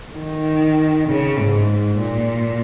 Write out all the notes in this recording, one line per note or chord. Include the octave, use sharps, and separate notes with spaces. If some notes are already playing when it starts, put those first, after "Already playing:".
D#3
C#3
G#2
A#2